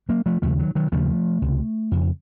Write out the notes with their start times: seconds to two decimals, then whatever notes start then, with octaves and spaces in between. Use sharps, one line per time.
0.09 F#3 A#3
0.26 F3 A3
0.42 D#2 C#3 F3 A3
0.59 D#3 F#3
0.75 D#3 F#3
0.92 D#2 C#3 F3 A3
1.42 C#2 C3
1.92 F2 C#3